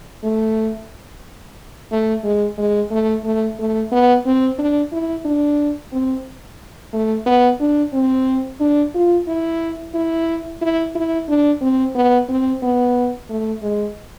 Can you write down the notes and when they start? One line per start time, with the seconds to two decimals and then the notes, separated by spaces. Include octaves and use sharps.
0.24 A3
1.91 A3
2.24 G#3
2.58 G#3
2.91 A3
3.24 A3
3.59 A3
3.92 B3
4.26 C4
4.58 D4
4.92 E4
5.25 D4
5.92 C4
6.93 A3
7.26 B3
7.60 D4
7.93 C4
8.60 D4
8.94 F4
9.28 E4
9.94 E4
10.61 E4
10.95 E4
11.28 D4
11.61 C4
11.95 B3
12.29 C4
12.63 B3
13.30 A3
13.62 G#3